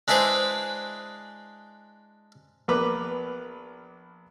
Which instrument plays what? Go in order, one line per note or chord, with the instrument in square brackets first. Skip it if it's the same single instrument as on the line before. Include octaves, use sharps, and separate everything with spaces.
[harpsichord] G#3 D4 E4 G#4 B4 C5
[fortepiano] A#1 B3 A#4 B4 D6